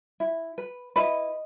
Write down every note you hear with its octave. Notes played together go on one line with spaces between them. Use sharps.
E4
B4
E4 B4 D#5